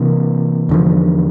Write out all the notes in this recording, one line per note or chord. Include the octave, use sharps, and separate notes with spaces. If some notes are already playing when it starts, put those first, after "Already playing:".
Already playing: C3 E3 A#3
E2 D3 F3